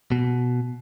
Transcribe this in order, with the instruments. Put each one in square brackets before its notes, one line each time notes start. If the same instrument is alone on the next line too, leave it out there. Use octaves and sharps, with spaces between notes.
[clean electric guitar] B2